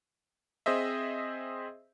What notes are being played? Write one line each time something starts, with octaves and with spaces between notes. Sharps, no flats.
C4 G#4 C5 D#5 E5